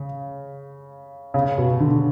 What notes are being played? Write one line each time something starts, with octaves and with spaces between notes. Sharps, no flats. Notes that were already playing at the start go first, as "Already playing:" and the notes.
Already playing: C#3
C#3
B2
D3